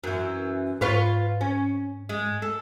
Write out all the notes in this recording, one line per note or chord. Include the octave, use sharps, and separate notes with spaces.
F#2 E3
G#2 F4 B4 C#5
C#4
G#3
A4